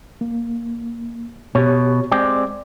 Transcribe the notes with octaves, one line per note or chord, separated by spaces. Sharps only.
A#3
B2 G4 C#5
G#3 C4 G4 D5